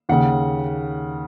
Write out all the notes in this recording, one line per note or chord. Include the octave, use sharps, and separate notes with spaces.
D#2 C#3 F#5